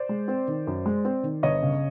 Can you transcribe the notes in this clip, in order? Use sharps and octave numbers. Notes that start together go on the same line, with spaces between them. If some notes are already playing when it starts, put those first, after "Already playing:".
Already playing: C5 D5
G#3
C4
D#3
F#2
G#3
C4
D#3
G1 C#5 D#5
C#3